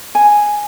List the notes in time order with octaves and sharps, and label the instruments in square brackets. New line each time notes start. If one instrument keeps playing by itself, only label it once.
[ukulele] G#5